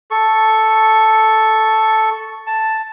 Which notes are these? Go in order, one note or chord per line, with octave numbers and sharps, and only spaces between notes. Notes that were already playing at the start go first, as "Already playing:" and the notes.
A4 C#6
A5